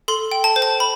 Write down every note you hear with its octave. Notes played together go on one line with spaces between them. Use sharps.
A4 C6
G5
A5
C5
A5
B5